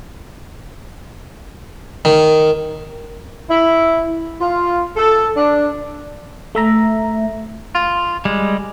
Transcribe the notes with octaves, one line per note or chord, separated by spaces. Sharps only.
D#3
E4
F4
A4
D4
A3 E5 A#5
F4
G3 G#3